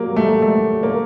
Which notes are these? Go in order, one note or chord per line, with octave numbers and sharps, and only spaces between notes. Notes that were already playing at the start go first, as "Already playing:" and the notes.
Already playing: F#3 G3 A#3
A3
A3
A#3